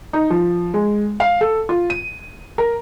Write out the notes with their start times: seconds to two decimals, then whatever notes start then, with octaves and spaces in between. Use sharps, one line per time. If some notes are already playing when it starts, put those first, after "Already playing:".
0.13 D#4
0.30 F3
0.74 G#3
1.20 F5
1.41 A4
1.69 F4
1.90 D#7
2.58 A#4